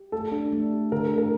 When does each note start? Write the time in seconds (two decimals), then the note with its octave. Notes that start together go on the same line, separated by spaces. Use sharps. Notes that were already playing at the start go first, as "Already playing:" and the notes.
Already playing: G4
0.12 A3 A4
0.32 D4
0.52 A3
0.73 G4
0.92 D3 A#4
1.05 A#4
1.11 A3
1.18 A#4